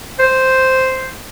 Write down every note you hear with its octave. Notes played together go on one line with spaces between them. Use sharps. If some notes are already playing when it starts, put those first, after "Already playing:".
C5